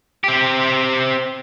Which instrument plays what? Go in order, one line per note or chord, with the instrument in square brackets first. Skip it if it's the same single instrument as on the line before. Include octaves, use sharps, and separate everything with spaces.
[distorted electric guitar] C4 G4